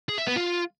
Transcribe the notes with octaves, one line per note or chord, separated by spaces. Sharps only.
G#4
E5
B3
F4